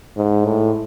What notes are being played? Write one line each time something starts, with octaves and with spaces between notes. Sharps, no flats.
G#2
A2